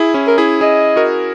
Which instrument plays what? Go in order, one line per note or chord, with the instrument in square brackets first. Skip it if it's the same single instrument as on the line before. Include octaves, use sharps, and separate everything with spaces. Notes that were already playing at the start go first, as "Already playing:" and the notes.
Already playing: [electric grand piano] E4 G#4
C#4 E4
[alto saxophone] A#4
[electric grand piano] E4 G#4
[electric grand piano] E4 G#4 [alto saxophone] D#5
[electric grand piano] F#4 A#4